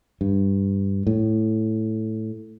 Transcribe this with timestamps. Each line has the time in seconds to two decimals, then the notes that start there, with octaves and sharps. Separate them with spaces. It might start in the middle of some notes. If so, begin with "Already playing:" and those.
0.21 G2
1.07 A2